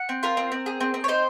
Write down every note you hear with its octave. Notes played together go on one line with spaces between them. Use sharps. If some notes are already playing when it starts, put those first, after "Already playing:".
Already playing: F#5
C4
F4 A#4
C4
C4
G#4
C4
C4
C#5
D#4 C5